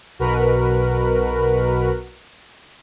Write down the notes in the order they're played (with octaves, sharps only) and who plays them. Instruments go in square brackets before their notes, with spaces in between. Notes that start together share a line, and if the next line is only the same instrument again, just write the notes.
[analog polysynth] B1 B2 F#4 A#4 B4 F#6